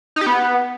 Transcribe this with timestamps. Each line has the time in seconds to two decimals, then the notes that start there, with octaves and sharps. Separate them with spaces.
0.16 D#4
0.21 G4
0.26 B3